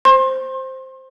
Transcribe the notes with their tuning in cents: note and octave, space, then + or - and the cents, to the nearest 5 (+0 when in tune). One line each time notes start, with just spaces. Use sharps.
C5 +0 C6 +35